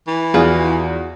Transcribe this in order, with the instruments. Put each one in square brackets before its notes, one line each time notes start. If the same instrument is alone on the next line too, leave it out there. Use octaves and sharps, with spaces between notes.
[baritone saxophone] E3
[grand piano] E2 [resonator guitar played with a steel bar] F4 F#4 [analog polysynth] G#4